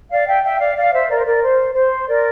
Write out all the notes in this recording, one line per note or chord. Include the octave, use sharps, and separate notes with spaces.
D5 F5
E5 G5
E5 G5
D5 F5
D5 F5
C5 E5
A#4 D5
C5
A#4 D5
C5
C5
A#4 D5